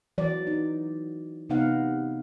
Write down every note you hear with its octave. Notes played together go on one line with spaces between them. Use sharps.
E3 F#3 D5
D#4
C3 B3 D#4 F5 F#5